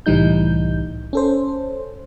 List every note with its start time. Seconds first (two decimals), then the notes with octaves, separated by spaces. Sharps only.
0.06 C2 A2 E3 G3 D#4 G6
1.13 C#4 A4 C5